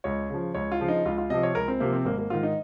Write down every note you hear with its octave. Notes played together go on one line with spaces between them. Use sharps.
C#2 C#5
C#3 F3
C#2 C#5
F4
C#3 F3
D#4
C#2 F4
F4
C3 F3 D#5
C#5
C#2 A#4
C4
C3 F3 A#3
C4
G#1 A#3
A#3
G#2 D#3 F4
D#4